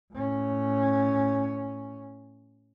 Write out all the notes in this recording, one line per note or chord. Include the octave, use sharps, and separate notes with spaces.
A2 C#4